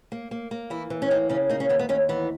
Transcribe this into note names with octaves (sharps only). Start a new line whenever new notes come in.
A#3
A#3
A#3
E3 E4
E3
C#4
A#3 D#4
C#3 C#4
A#3 D#4
C#4
D#2 B3
B3
D#2 C#4
E3 B3